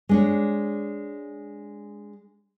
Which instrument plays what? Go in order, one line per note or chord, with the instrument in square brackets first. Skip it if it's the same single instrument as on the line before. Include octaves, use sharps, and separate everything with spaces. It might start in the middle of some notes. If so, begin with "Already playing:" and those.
[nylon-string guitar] G#3 D4 C#5